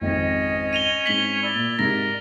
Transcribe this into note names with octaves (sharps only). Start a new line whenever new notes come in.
G#1 F2 C#4 D#5
D#7 F7 G7
G#2 C4 B6 F#7 G7
E4 D5
A#2
G#2 C3 A#4 A#6